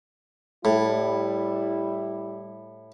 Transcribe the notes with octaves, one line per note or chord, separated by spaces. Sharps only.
A2 G3 E4